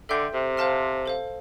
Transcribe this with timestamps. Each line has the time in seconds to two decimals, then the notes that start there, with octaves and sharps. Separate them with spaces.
0.09 D3 A4 E5 G5 C6 G6
0.33 C3
0.57 C5 F5 A5 C6 F6
1.06 A4 C5 F5